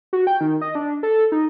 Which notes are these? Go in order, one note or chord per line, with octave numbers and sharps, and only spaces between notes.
F#4
G5
D#3
D#5
D4
A4
D#4